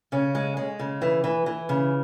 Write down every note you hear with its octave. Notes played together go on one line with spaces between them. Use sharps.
C#3 C#4
G#3
G#3
C#3
E3
E3
E3
C#3